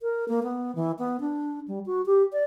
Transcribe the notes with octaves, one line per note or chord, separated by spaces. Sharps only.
A#4
A#3
B3
E3
B3
D4
G3
F#4
G4
D5